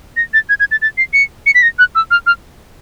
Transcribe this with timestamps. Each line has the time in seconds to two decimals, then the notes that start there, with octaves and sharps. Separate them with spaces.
0.17 A#6
0.34 A6
0.49 G#6
0.60 G#6
0.71 A6
0.82 A6
0.98 C7
1.13 C#7
1.46 C#7
1.55 B6
1.62 A#6
1.79 F#6
1.95 E6
2.11 F6
2.26 F6